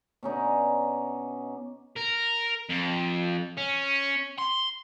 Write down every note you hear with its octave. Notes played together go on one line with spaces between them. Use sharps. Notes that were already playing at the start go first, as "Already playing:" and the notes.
B2 C#4 D#4 D5
A#4
F2
C#4
C6